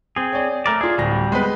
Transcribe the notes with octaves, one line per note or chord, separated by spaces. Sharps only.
C4 G#4
C#5 D5
A3 A#4 D5
F4 G#4 D5
D1 G3 A#6
G#3 B3 B4